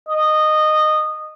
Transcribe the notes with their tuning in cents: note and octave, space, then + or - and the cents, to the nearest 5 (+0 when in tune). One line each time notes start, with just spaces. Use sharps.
D#5 -15